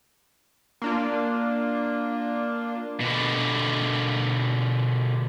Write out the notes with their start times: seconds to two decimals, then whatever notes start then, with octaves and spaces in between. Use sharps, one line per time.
0.82 A#3 D4 F4
3.00 B2 D3